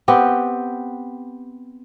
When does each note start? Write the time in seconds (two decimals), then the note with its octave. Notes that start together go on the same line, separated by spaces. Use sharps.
0.08 B3 C4 G4